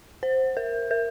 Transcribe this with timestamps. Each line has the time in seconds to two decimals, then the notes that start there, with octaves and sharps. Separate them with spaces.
0.23 C5
0.57 A#4
0.91 A#4